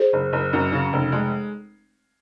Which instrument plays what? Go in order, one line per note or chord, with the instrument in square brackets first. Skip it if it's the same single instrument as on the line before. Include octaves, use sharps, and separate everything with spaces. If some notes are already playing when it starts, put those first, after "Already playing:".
Already playing: [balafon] G#4 C5
[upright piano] F#1
F#1
F#2
C#3
F1
G#3